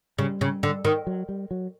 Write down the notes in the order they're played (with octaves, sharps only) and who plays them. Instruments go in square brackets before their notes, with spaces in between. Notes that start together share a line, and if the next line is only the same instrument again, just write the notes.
[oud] C#3 [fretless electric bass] G3
[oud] C#3
D3
D#3
[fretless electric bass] F#3
G3
F#3